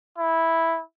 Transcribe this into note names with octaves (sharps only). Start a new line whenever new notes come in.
E4